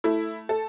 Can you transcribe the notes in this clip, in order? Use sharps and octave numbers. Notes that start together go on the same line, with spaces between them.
A3 E4
A4